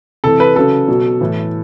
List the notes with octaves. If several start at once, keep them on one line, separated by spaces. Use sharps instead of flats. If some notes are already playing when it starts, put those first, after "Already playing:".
C3 E3 A4
B4
C#3 F#3 A4
B2 F#3
A2 E3